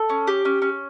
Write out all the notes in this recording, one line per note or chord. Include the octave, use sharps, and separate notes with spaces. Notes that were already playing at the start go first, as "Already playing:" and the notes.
Already playing: A4
C#4
G4
C#4
C#4